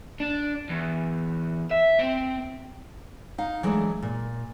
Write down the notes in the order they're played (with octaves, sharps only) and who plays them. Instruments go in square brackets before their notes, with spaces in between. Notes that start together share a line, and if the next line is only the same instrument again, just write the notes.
[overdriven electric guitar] D4
E2
E5
C4
[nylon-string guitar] D#4 F5
E3 F#3 G#3 A3 B3 D4
A#2